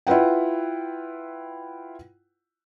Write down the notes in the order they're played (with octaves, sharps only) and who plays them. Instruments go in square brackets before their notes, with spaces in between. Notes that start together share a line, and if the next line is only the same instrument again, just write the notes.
[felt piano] E4 F4 B4 F#5 G5